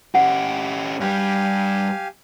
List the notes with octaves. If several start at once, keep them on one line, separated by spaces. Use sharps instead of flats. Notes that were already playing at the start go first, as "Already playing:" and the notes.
C#4 G4 F#5
G2 G3 G4 F5 G#5